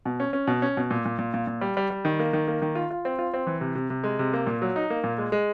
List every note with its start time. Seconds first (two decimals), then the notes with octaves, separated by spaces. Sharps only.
0.05 B2
0.20 C#4
0.33 C#4
0.47 B2
0.62 C#4
0.77 B2
0.91 A#2
1.05 A#2
1.19 A#2
1.34 A#2
1.47 A#2
1.61 G3
1.77 G3
1.90 G3
2.05 D#3
2.20 A#3
2.33 D#3
2.48 A#3
2.62 D#3
2.75 F4
2.91 F4
3.05 C4
3.19 F4
3.34 C4
3.47 E3
3.61 C3
3.75 C3
3.90 C3
4.04 G#3
4.19 C3
4.33 A#3
4.47 A#2
4.62 F#3
4.76 D#4
4.90 A#3
5.04 A#2
5.18 G#3
5.32 G#3